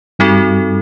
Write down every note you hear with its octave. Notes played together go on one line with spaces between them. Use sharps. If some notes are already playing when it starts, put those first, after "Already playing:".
G2 G3 C4 D#4 F#4 A4